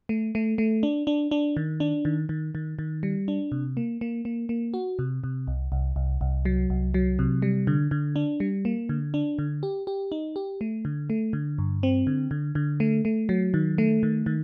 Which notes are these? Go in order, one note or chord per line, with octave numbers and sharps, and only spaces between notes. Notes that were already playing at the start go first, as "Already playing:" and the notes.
A3
A3
A3
D4
D4
D4
D#3
D4
D#3
D#3
D#3
D#3
G3
D4
C3
A#3
A#3
A#3
A#3
F#4
C3
C3
C2
C2
C2
C2
F#3
C2
F#3
C3
G3
D3
D3
D4
G3
A#3
D3
D4
D3
G4
G4
D#4
G4
A3
D3
A3
D3
G2
C4
D3
D3
D3
A3
A3
F#3
D#3
A3
D#3
D#3